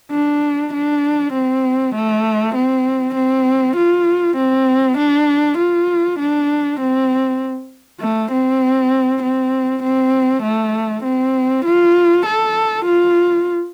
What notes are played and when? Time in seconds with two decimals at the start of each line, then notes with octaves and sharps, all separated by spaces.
0.12 D4
0.73 D4
1.33 C4
1.95 A3
2.55 C4
3.15 C4
3.76 F4
4.37 C4
4.98 D4
5.58 F4
6.19 D4
6.80 C4
8.00 A3
8.32 C4
9.23 C4
9.83 C4
10.43 A3
11.04 C4
11.65 F4
12.26 A4
12.85 F4